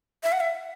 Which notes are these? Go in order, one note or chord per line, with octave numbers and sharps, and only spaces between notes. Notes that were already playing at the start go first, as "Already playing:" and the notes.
E5
F#5
E5